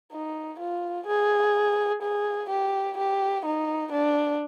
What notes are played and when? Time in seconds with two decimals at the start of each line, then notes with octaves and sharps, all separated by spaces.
0.12 D#4
0.59 F4
1.07 G#4
2.02 G#4
2.50 G4
2.98 G4
3.45 D#4
3.92 D4